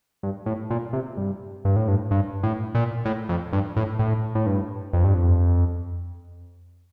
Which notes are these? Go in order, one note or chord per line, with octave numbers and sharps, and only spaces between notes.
G2
A2
A#2
C3
G2
G2
A2
G2
G2
A2
A#2
A2
F2
G2
A2
A2
A2
G2
F2
G2
F2